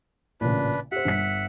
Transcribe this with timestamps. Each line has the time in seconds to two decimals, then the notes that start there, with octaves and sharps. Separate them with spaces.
0.41 A1 A#2 C#3 D4 B4
0.92 G4 C5 E5 F#5
1.05 G1 B6